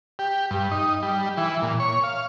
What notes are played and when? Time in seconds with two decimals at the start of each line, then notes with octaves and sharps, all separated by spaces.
0.19 G4
0.51 G2
0.71 D#4
1.03 G3
1.37 E3
1.62 A#2
1.80 C#5
2.04 F5